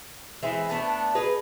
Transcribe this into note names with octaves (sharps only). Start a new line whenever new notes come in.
E3 G#3 C4 E5
A3 B3 D4
D#4 G#4 B4